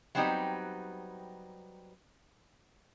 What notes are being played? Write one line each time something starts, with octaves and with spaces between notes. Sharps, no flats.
F#3 G3 B3 C4 D#4 G4